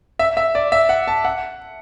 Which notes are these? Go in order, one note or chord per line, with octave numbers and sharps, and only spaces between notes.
E5
E5
D5
E5
F#5
A5
F#5